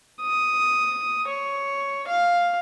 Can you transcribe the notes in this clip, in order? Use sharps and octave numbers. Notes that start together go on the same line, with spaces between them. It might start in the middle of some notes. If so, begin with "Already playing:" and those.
D#6
C#5
F5